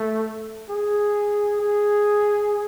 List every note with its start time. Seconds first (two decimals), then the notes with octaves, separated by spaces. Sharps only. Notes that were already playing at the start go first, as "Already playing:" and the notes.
Already playing: A3
0.69 G#4
1.61 G#4